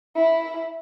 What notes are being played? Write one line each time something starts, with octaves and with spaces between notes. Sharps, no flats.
E4